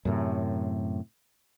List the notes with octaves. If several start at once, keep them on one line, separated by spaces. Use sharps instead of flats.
F#2 A2 C3